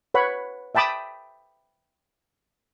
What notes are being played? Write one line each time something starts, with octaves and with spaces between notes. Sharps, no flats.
B4 C#5 F#5 B5
E5 G5 A5 B5 D6 D#6